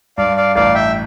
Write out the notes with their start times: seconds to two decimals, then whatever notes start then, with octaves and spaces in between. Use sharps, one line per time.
0.18 G2 D5 F5
0.37 D5 F5
0.55 A1 D5 F5
0.75 E5 G5